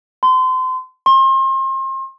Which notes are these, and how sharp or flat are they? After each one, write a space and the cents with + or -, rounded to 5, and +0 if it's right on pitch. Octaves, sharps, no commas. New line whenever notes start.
C6 -30
C6 +35